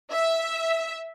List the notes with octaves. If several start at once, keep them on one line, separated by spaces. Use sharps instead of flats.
E5